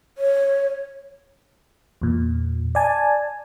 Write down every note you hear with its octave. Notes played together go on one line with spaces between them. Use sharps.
C#5
E2 A#2
D5 G#5 A5